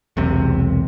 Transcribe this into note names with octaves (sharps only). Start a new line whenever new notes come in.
E1 B1 C3